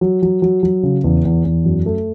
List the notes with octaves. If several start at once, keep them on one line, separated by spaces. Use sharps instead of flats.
F#3
F#3
F#3
F#3
C#3
E2
E2
E2
F#2
A3